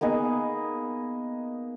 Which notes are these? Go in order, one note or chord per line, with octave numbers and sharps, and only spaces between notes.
A#3 B3 D#4 G#4